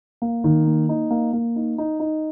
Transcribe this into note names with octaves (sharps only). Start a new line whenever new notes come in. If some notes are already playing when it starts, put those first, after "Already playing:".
A#3
D#3
A#3
D#4
A#3
A#3
D#4
D#4
D#4